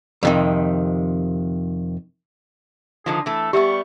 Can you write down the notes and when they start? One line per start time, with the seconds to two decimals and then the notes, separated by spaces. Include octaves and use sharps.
0.23 F2 C3 D#3
3.06 D3 D#3 F3 G#4
3.26 E3 A3 A4
3.53 G3 B3 G4 E5 C#6 E6